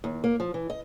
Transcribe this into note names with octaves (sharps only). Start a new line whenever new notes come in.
D#2
A#3
F3
E3
D#5